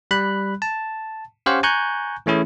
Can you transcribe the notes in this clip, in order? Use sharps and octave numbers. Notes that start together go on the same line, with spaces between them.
G3 B5 F#6
A5
C#4 G4 C5 C#5 F5 F#5
G#5 A#5 C#6 F#6 G6
E3 A3 C#4 E4 G#4